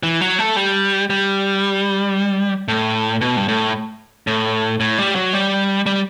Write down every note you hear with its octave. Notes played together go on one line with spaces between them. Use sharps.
E3
F#3
A3
G3
G3
A2
B2
G2
A2
A2
A2
G3
F#3
G3
G3